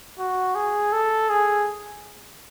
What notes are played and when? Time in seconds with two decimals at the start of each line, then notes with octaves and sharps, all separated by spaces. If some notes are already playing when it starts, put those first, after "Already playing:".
0.19 F#4
0.55 G#4
0.92 A4
1.30 G#4